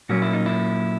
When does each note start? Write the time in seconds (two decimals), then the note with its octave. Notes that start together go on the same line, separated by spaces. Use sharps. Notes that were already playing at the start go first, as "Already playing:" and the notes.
0.09 A#2 F#3 A#3 C#4 F#4
0.22 E4
0.33 D#4
0.46 E4